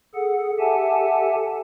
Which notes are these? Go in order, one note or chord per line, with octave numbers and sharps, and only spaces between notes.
G#4 A4 F#5
G4 A4 E5 F#5 G#5 A5